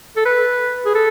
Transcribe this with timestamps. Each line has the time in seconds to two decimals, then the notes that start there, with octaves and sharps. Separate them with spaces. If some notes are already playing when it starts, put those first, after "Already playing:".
0.17 A4
0.26 B4
0.86 G#4
0.95 A4